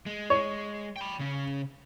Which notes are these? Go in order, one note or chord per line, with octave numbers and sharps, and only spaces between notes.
G#3
C#5
G5 B5
C#3 C#4